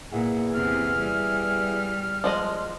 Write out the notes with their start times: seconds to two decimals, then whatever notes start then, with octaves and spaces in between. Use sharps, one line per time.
0.12 A#2 B3 E4 G#4 F#5
0.53 E2 C3 F6
0.98 G3
2.24 F3 G#3 D#5